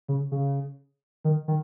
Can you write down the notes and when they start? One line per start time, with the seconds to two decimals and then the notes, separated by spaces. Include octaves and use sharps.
0.09 C#3
0.32 C#3
1.25 D#3
1.48 D#3